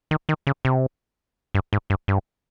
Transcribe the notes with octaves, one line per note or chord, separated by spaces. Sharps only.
D#3
D#3
C#3
C3
G2
G#2
G2
G2